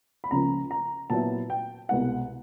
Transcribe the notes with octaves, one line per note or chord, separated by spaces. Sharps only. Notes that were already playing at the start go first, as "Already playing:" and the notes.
B5
C#2 C#3 F3 A#3 A#5
A#5
A#2 F#3 B3 E4 A5
G5
C2 B2 G#3 B3 F#5